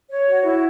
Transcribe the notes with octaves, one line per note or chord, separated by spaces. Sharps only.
C#5
F#4
E4